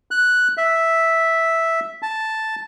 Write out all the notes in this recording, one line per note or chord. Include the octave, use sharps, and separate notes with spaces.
F#6
E5
A5